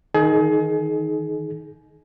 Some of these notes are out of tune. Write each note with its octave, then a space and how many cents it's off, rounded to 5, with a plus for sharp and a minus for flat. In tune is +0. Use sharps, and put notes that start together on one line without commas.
D#3 +10 D#4 +0 G#4 +35